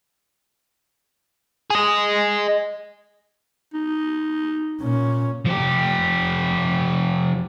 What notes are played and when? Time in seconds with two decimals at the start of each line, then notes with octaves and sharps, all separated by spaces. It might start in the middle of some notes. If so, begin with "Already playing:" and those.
1.71 G#4 D#5
3.74 D#4
4.81 A#2 C#4
5.46 F3 G4